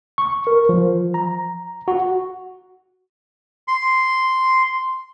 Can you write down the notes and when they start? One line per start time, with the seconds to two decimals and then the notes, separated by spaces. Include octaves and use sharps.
0.18 C#6
0.47 A#4
0.69 F3
1.14 A#5
1.88 F#4
3.68 C6